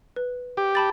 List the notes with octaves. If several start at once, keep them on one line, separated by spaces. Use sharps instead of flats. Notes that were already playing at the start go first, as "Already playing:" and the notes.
B4
G4
A5 B5 A6